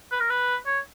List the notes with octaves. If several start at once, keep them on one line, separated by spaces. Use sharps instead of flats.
B4
A#4
B4
C#5